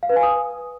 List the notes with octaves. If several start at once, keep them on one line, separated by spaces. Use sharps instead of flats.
F5
B4
G#5
D#6